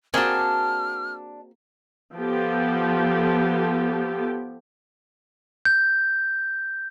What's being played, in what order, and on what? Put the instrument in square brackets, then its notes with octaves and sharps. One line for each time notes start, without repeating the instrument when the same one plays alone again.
[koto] A#3 G#4 G5 [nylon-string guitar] C4 F#4 [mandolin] D4 A5 [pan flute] F6
[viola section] F3 B3 G4 A4
[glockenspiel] G6